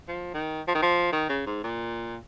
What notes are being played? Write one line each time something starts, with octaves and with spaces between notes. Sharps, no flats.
F3
D#3
F3
D#3
F3
D#3
C#3
G#2
A#2